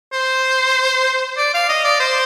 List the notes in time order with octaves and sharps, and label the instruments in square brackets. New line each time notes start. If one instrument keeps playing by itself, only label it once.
[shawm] C5
D5
F5
D#5
D5
C5